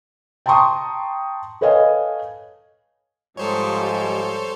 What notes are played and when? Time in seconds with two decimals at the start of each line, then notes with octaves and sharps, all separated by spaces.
0.46 G5 A5 A#5 C6 C#6 D#6
1.61 A4 B4 C#5 D#5 F5 G#5
3.37 G#2 F3 G3 A4 C5 C#5